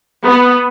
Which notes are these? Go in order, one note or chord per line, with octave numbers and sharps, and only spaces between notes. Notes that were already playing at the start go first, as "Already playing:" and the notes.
B3